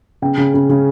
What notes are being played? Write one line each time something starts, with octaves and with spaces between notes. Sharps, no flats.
C#3 G5
C#3
C#3
C#3